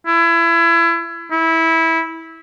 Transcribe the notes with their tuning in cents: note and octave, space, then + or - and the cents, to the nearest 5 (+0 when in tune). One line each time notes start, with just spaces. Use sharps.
E4 +30
E4 -15